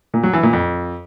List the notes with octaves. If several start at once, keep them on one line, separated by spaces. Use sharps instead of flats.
A#2
F#3
E3
A#2
F2